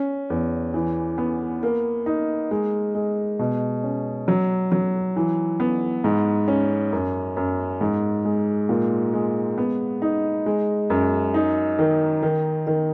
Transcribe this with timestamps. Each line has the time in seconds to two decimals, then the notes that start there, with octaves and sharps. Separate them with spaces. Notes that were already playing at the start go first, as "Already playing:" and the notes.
Already playing: C#4
0.30 E2
0.74 E3
1.18 B3
1.63 A#3
2.06 D#4
2.51 G#3
2.95 G#3
3.39 B2
3.83 C#4
4.28 F#3
4.72 F#3
5.16 E3
5.60 B3
6.04 G#2
6.48 C#4
6.92 F#2
7.37 F#2
7.81 G#2
8.25 G#3
8.69 A#2
9.13 G#3
9.58 B3
10.02 D#4
10.46 G#3
10.90 F#2
11.34 D#4
11.79 D#3
12.22 D#3
12.67 D#3